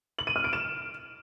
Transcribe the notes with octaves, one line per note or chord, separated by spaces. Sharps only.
F#7
D#7
F6
D7
E7